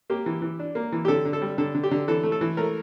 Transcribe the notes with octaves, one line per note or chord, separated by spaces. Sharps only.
A#3 G4
E3
E3
D4
A#3
E3
G4
D3 A4
D3
A4
G3
D3 A4
D3
G4
D3
E3 A4
A3
A4
E3
A3 A#4